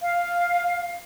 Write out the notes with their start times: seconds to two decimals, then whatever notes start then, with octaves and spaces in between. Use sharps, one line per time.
0.01 F5